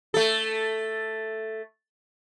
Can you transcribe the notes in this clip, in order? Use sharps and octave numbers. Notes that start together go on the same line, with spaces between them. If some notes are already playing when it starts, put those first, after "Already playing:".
A3 A4